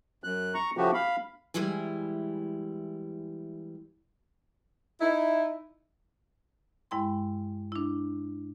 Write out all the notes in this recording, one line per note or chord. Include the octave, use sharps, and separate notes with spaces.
F#2 F#6
A#5 C#6
C#3 F3 A3 F#4 G4
F5 B5
E3 G3 G#3 E4 G#5
D#4 E4
G2 G#3 E4 G5 C6
D4 E4